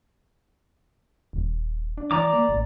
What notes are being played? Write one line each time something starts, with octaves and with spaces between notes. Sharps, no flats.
D#1
D4
E3 D5 A#5 D6
A#3
A1